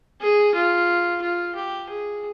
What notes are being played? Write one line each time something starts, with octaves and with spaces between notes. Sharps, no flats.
G#4
F4
F4
G4
G#4